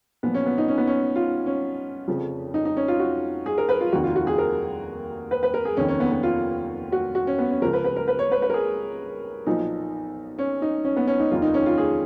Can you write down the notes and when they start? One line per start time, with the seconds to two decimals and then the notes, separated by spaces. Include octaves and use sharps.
0.23 B1 A#2 F3 B3
0.34 C#4
0.46 B3
0.58 D#4
0.68 C#4
0.78 B3
0.87 C#4
1.16 F4
1.46 C#4
2.08 F1 F2 C#3 F3
2.54 D#4
2.65 D#4
2.77 C#4
2.88 F4
3.00 F#4
3.46 G#4
3.58 A#4
3.69 B4
3.81 F4
3.92 F1 D#2 D#3 F#4
4.04 F4
4.16 F#4
4.27 G#4
4.38 A#4
5.31 B4
5.43 B4
5.54 A#4
5.65 G#4
5.77 F1 D#2 D#3 C#4
5.88 C#4
6.00 B3
6.12 B3
6.23 F4
6.92 F#4
7.15 F#4
7.27 C#4
7.38 B3
7.51 C#4
7.62 C#2 C#3 F3 A#4
7.73 B4
7.84 B4
7.96 A#4
8.08 B4
8.19 C#5
8.32 B4
8.42 B4
8.50 A#4
8.54 G#4
9.47 B1 A#2 F3 D#4
10.39 C#4
10.62 D#4
10.85 C#4
10.97 B3
11.08 C#4
11.20 D#4
11.31 F1 D#2 D#3 F4
11.42 D#4
11.54 C#4
11.66 F4
11.78 G#4